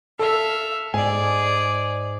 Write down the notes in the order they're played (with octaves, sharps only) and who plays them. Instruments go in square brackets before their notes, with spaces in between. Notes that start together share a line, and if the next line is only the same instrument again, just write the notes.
[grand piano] A4 [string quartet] E5 F5
[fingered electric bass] G#2 [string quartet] G#4 D5 [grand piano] G#5